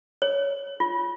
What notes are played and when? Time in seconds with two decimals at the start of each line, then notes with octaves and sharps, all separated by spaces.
0.22 C#5
0.80 F4